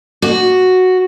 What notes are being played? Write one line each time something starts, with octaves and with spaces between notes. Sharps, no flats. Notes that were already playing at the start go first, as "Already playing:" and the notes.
F#4